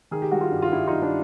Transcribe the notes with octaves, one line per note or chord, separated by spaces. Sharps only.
D#3 G#4
G4
G3 F#4
F4 G4
G2
F4
G2 E4 F#4
G2 D#4 F4
D4 E4